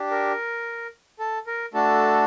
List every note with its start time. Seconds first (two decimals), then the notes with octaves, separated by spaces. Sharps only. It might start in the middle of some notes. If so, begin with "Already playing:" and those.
Already playing: D4 G4
0.11 A#4
1.19 A4
1.47 A#4
1.74 A3 D4 F#4 A4